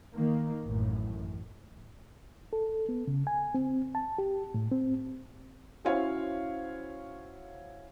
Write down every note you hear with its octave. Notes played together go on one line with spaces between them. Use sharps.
D#3 A#3
A1 F#2 A2
A4
B3
C#3
G#5
C4
A5
G4
A2
C4
C#4 E4 F#4 C5 C#5 F5